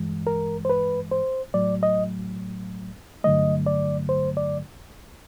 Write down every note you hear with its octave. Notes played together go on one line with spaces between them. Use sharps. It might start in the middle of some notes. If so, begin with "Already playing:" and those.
Already playing: G2 E3 G#3
A#4
C5
B4
C5
A2 F#3 A3 D5
D#5
G2 D3 F#3 A3 D#5
D5
C5
D5